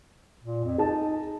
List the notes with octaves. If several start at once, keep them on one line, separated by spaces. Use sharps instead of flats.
A#2
F2
D#4 G#4 A5